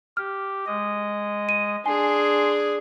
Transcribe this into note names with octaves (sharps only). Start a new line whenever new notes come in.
G4 F6
G#3 D#5
D#7
D4 G#4 G#5 C6